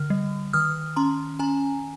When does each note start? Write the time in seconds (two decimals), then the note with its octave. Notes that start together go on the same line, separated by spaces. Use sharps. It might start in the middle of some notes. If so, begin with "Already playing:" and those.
Already playing: D3 F6
0.10 G3
0.53 D#3 D#6 F6
0.96 C#4 A#5 C6
1.39 C#4 G#5 A#5